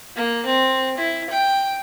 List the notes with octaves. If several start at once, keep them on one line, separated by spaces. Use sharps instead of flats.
A#3
C4
E4
G5